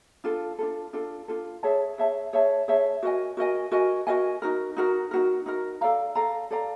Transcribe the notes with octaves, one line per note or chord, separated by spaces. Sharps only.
D4 F4 A4
D4 F4 A4
D4 F4 A4
D4 F4 A4
G#4 C#5 E5 A5
G#4 C#5 E5 A5
G#4 C#5 E5 A5
G#4 C#5 E5 A5
F#4 A#4 D#5 G#5
F#4 A#4 D#5 G#5
F#4 A#4 D#5 G#5
F#4 A#4 D#5 G#5
D#4 F#4 A#4
D#4 F#4 A#4
D#4 F#4 A#4
D#4 F#4 A#4
A4 D5 F5 A#5
A4 D5 F5 A#5
A4 D5 F5 A#5